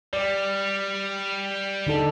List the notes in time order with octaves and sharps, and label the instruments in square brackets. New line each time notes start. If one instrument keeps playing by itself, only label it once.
[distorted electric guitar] G3 [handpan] D5
[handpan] D3 D#4 A4